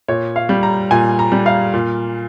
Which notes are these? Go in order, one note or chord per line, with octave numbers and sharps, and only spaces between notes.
A#2 C#5
F5
G3
A#5
A#2 G#5
A#5
G3
F5
A#2